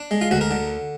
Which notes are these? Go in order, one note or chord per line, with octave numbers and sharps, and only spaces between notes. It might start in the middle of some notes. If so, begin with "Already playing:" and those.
Already playing: D4
G#3
F4
D2 F#4
A#4
D3